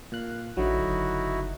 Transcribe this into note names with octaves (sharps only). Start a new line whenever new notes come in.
A#2 F5 F#6
A1 D3 F#3 D#4 E4 F#4
F#1